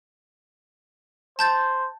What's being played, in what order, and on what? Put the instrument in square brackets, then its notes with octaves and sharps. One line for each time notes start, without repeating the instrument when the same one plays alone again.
[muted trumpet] C5 [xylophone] A5 G6 A6